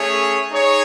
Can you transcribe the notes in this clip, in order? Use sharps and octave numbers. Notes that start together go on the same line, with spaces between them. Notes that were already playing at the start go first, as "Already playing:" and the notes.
Already playing: A3 C#4 G#4 C#5
D#4 G#4 C#5